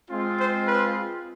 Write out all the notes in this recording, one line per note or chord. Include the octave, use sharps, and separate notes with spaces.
G#3 C4 F4
C5
B4